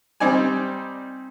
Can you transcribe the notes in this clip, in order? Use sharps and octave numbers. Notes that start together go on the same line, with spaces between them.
G3 C4 D#4 D5 G#5